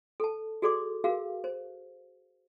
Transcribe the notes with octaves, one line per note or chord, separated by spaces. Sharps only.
A4 A5
F#4 G#4 A4 D5 C6 D6
F#4 G#4 A#4 F5
C5